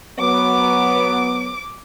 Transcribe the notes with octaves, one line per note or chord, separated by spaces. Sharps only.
F#3 B3 D6 D7